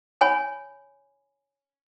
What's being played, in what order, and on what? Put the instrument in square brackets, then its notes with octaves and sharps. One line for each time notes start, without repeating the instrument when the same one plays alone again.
[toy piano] C#5 G#5 B5